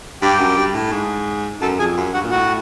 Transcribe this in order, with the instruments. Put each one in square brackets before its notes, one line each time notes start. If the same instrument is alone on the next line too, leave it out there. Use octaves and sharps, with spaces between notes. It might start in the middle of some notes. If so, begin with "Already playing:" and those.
[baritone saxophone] G2 [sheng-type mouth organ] G4 G5
[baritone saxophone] F#2
G2
A2
G#2
[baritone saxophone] F#2 [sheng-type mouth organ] A4 A5
[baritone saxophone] F2 [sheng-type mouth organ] G#4 G#5
[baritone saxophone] F#2
[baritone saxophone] G2 [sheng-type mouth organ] F#4 F#5
[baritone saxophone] A#2
[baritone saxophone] A2 [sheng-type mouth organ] F#4 F#5